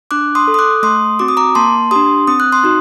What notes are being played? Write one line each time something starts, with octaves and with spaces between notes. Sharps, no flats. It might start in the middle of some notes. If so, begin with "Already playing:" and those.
D4 D6 F#6
C6 D#6
A4
D#6
D6 F#6
A3 C6 D#6
C4 F#4 D6
D#6
A#5 D6
A#3 A5 C6
D4 G4 C6 D#6
C4 D#6
F#6
C6 D#6
D#4 F#4